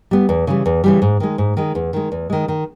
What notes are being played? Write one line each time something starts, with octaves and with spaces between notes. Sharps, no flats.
G3 B3
E2
C#3 E3 G3
E2
C#3 E3 G3
G#2
D#3 G#3
G#2
D#3 G#3
E2
D#3 G#3
E2
D#3 G#3
D#3